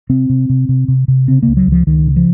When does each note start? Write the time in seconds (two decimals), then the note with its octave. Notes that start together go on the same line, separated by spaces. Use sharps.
0.09 C3 C4
0.29 C3
0.49 C3
0.69 C3
0.88 C3
1.08 C3
1.28 C#3 C4
1.43 C#2 A#3
1.57 F#3
1.67 C#2
1.72 F3
1.87 C#2 D#3
2.06 C#3
2.16 F3